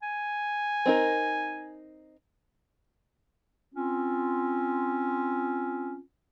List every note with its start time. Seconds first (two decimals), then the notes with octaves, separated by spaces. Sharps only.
0.02 G#5
0.86 C4 D#4 A#4
3.75 C4 C#4 F4